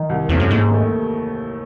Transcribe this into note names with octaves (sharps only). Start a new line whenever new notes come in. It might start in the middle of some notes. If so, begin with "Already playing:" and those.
Already playing: D#3
C2
E2 C3 E3 A3 C#4
F#2
D#2 G#2
D#3 A3